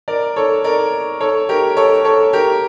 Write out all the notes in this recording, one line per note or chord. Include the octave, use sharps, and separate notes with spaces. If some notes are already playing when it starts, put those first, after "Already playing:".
A#4 D5
A4 C#5
A#4 D5
A4 C#5
G4 A#4
A4 C#5
A4 C#5
G4 A#4